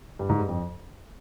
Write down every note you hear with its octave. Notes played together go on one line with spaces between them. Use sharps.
G2
G#2
G2
F2